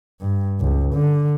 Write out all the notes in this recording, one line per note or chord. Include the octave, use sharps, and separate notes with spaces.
G2
C#2
D3